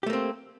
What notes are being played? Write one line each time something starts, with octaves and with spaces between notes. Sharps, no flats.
A3 A#3 C4 G4